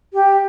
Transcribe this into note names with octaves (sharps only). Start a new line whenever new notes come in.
G4